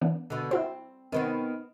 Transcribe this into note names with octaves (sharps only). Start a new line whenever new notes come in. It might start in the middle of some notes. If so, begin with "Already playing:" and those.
E3 B3 D4
B2 D3
C4 E4 F#4 C5
C3 D#3 B3 C4